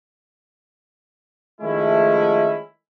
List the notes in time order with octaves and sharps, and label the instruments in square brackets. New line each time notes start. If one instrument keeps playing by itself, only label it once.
[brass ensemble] D#3 F3 G#3 A3 C#4 E4